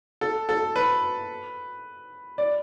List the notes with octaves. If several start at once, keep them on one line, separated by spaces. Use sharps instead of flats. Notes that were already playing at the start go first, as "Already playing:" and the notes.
A4
A4
B4
D5